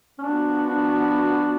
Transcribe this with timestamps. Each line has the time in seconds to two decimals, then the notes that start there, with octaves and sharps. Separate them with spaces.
0.19 C#4
0.23 F3 B3 D4 F#4
0.66 D4